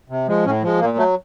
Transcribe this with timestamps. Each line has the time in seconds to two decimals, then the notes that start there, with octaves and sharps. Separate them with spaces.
0.09 C3
0.28 F3 G#3
0.45 A2 C#4
0.62 F3 G#3
0.80 A#2 A#3
0.97 F#3 A3